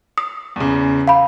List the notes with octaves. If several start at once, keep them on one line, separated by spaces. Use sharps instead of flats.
D#6
E2 C#3
F5 B5